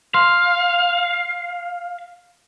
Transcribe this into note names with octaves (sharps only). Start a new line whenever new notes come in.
F5 C6